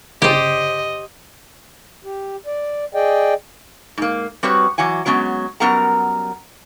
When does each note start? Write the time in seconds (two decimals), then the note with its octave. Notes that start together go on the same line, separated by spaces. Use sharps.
0.22 G1 C#3 G4 C5 D5 D#5
2.05 G4
2.46 D5
2.94 G#4 D5 D#5 G5
3.98 G#2 A#3
4.43 G3 C4 F#4 B4 C#5
4.78 E3 F#3 F#5 G#5
5.06 F#3 G#3 B3 C#4
5.60 F#2 G3 B3 A#4 F#5 A#5